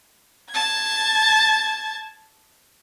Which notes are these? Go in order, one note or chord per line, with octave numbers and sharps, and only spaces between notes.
A5 G#6